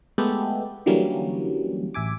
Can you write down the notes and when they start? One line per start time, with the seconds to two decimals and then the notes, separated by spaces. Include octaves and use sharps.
0.18 G#3 A3 B3 G4 A4
0.86 D3 E3 F#3 G3 A#3 C#4
1.94 A1 E5 G#5 D6